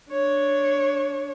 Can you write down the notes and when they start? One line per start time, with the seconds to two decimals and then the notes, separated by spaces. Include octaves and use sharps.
0.11 D4 C#5